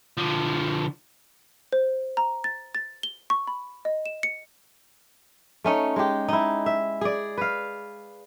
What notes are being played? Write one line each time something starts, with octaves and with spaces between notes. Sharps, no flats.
D3 F3
C5
A#5
A6
A6
G7
C#6
B5
D#5
E7
C#7
A3 C#4 D#4
G#3 G4
D#4 E4
E5
G#4 D5
B4 F5